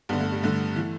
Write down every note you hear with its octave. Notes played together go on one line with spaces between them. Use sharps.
G2 D3 G3 B3
A3
G3
G2 D3 A3
E3